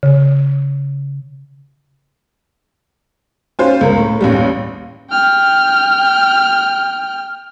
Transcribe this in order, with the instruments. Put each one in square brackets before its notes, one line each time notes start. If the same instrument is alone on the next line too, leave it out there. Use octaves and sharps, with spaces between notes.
[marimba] C#3
[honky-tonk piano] C#4 F4 C5
C#2 A#4
A2
A1 D#2 G3
[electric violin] G5 F6